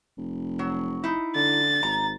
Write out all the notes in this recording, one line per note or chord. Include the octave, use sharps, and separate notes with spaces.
F1
F#3
D#4 E4
D3 A6
G#1 A#5